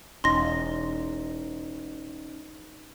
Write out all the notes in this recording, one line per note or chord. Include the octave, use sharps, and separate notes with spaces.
E1 C#4 D#4 C6 A#6